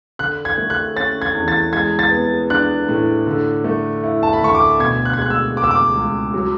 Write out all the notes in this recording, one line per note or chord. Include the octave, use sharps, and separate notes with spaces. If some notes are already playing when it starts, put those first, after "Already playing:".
D3 F#6
G#6
A3
F#6
C#4 A6
G#6
E2
A6
G#3 G#6
A6
B3
D4 F#6
A2
D3
A3
E4
A5
B5
D2 C#6
D6
B2 G#6
F#6
G#6
G#3 F#6
E6
C#2 D6
E6
D6
C#2
F#3